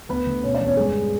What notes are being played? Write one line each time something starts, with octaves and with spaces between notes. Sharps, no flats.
D2 B3 B4
D2
B2 C#4 C#5
D4 D5
E2
C#4 C#5
G2 G#3 G#4
D3